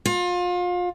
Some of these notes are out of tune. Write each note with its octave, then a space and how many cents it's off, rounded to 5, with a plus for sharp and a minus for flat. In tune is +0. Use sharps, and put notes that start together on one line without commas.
F4 +30